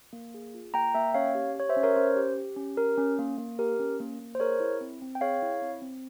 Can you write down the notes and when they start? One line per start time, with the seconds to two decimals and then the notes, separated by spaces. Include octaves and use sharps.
0.13 A#3
0.34 G#4
0.54 F4
0.74 A#3 G5 A#5
0.95 A#3 E5 G5
1.14 C#4 C#5 F5
1.35 G4
1.55 G4 C#5
1.69 C5 E5
1.77 C#4
1.83 A#4 C#5
1.96 C#4 C5
2.16 G4
2.37 G4
2.57 C#4
2.77 G4 A#4
2.98 C#4
3.19 A#3
3.38 A#3
3.59 G4 A#4
3.79 C#4
4.00 A#3
4.20 A#3
4.35 C5
4.40 G#4 A#4 C#5
4.60 E4
4.81 C4
5.02 C4
5.15 G5
5.21 G#4 C#5 F5
5.42 E4
5.62 C4
5.82 C4